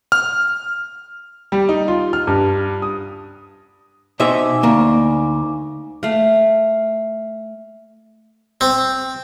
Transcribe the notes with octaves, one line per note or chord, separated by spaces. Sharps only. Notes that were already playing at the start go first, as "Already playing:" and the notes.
F6
G3
D#4
F4
F6
G2
D#6
B2 D#4 C5 E5 G#5 D6
D2 A#3
A3 F5
C4